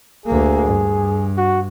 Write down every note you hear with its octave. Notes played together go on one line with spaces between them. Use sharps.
D2 A#3 G#4
G2
F#4